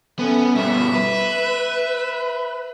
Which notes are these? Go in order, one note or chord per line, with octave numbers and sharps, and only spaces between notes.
A3 B3 C#4
G2 B2 E5
B4